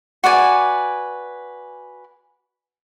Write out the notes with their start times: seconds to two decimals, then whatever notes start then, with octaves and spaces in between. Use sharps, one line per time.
0.24 F#4 B4 D5 G#5